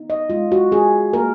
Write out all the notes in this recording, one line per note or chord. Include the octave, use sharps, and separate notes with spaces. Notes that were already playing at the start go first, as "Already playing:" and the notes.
Already playing: B3 D#4
D#5
G#3 F4
F#4
C#4 G#4
A#3 A#4